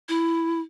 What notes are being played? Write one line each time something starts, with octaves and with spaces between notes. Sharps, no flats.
E4